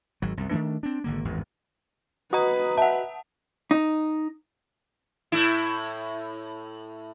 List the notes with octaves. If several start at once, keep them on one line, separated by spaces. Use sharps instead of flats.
G#1 F#3
C2 F#2
D#3 E3 A3 D4
C4 D4
G#1 D3 A#3
G#1 E2 G2
F#4 B4 D#5 A#5 D#6
E5 F#5 A5
D#4
A2 E4